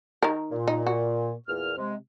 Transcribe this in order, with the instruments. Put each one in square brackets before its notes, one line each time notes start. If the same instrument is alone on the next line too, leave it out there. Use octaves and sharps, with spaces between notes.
[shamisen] D#3 A#4
[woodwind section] A#2
[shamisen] D#4
F#4
[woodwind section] E2 A#2 F6
C3 G#3